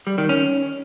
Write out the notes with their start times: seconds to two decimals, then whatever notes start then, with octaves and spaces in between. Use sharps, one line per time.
0.07 G3
0.18 D#3
0.29 C#4